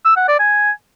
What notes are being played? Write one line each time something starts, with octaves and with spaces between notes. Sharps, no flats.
E6
F#5
D5
G#5